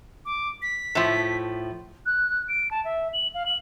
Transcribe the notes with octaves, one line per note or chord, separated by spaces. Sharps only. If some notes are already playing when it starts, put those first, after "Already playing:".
D6
B6
A2 F3
F#6
D7
A5
E5
F#7
F5
F#7